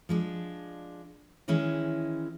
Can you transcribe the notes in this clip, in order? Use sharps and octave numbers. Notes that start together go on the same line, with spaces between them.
F3 G#3 D4
D#3 E3 G#3 C#4 E4